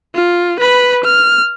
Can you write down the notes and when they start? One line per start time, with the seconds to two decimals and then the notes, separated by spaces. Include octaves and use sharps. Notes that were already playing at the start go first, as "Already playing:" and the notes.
0.15 F4
0.60 B4 B5
1.04 F6